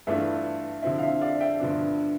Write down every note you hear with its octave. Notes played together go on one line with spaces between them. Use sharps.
G2 E3 A3 D4 F4 E5
D3 F3 C4 E4
F5
E5
D5 F5
E5 G5
G2 D3 F3 B3 D4